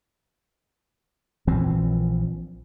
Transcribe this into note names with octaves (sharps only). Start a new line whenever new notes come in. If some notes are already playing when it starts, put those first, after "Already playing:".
A#1 E3 F3 C4